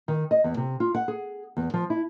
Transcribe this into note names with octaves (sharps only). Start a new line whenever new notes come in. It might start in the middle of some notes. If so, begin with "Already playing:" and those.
D#3
D#5
E2
C3
F4
F#5
G#4
E2
F3
E4